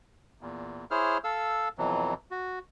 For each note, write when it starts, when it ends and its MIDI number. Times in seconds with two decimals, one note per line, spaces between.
0.41 0.85 40
0.41 0.85 46
0.91 1.18 64
0.91 1.18 68
0.91 1.18 72
0.91 1.18 73
0.91 1.18 89
1.24 1.68 69
1.24 1.68 77
1.24 1.68 88
1.78 2.14 41
1.78 2.14 47
1.78 2.14 52
1.78 2.14 54
2.31 2.59 66